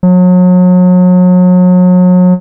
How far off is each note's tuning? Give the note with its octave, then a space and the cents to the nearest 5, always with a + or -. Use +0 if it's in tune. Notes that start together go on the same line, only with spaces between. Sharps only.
F#3 -35